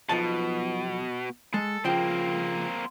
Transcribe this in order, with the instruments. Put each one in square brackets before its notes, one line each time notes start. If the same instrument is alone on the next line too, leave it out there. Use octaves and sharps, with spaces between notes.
[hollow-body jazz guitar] B1 F3 A5 [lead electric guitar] B2
[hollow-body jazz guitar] G#3 [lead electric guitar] A4
[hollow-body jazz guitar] C#3 F3 G5 [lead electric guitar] A#3 C4